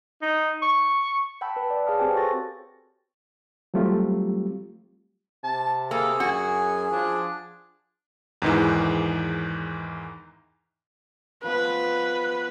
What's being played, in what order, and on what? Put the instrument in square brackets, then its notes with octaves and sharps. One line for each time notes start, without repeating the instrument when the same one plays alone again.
[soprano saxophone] D#4
C#6
[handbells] F#5 G5 A5 B5 E6 G6
B4 A5
D5
G#4 C#5 F5 A5 D#6 F6
C4 G4 B4 C5 G5 G#5
F#4 A4 C5 C#6 A6 A#6
[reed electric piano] F#3 G3 A3 C4 F4 G4
[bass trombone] C3 [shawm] A5
[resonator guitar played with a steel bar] A#3 [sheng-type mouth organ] G#4 [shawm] A4
[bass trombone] F#2 [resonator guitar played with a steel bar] F#4 [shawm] G#5
[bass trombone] F3 [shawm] D4
[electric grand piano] E2 G#2 D#3 E3
[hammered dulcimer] F3 B3 [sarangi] B4